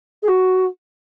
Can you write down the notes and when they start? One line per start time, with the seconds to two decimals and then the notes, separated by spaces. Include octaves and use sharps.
0.22 G#4
0.28 F#4